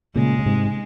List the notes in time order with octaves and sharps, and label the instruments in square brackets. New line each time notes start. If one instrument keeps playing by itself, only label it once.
[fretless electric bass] A#2 C#3 [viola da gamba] G#3
[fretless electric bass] C#3
G#2 C3